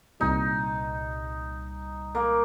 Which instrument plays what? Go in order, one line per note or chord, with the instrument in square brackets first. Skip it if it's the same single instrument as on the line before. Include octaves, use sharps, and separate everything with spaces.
[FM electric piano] C2 A#2 G3 [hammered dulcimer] D#4
[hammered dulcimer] A#3